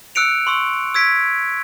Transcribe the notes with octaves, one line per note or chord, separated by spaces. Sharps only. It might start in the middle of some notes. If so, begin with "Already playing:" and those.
E6 F#6 C#7 D7 F7
C6 C#6 E6
E6 G#6 B6 D7